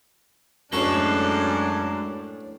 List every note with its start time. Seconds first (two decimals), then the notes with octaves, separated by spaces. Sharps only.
0.72 F#2 A2 G#3 D4 A4 B4 C#6